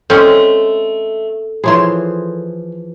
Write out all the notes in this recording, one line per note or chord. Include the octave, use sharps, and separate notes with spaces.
G#3 A3 C4 C#4 A4 E5
E3 F3 G#4 C5 C#5 C6